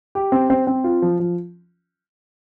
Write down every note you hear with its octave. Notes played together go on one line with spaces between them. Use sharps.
G4
C4
C4
C4
F4
F3
F3